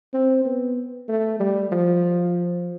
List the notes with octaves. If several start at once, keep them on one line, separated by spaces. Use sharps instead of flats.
C4
B3
A3
G3
F3